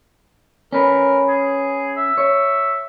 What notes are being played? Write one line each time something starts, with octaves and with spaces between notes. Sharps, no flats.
C#4 A#4 B4
G#4
E5
C#5